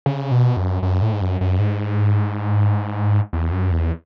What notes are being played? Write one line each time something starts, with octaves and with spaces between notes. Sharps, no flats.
C#3
B2
F#2
F#2
A2
G#2
F#2
F#2
G#2
E2
F#2
E2